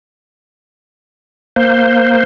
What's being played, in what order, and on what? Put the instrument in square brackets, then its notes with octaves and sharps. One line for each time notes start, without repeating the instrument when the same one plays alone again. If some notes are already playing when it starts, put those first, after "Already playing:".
[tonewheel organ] A#3 C5